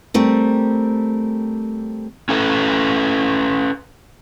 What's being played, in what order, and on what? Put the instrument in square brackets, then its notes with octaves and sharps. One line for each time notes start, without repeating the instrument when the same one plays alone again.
[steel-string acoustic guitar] G3 A3 C4 A#4
[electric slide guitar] C#4 A4 B4